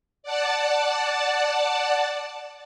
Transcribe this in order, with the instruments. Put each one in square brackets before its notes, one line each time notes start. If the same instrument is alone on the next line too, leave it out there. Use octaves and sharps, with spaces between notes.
[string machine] D5 F#5 A5